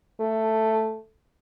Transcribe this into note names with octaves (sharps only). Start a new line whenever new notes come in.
A3